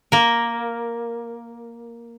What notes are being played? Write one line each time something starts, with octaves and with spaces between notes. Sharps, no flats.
A#3 A#4